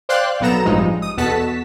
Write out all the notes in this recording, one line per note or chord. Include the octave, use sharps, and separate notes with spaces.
C5 D5 F5 G5 C6 F#6
B1 F#3 B3 A4 A#5 E7
A1 G2 F3 G#3 D#4
D#6
E2 B2 F#4 A4 A5 B6